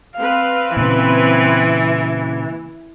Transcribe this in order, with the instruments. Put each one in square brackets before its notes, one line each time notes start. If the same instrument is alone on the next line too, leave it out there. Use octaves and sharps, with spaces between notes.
[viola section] C4 B4 [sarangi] F5
[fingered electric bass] A#2 C#3 [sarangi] E3